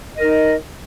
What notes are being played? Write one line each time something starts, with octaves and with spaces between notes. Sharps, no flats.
D#4 A#4 D#5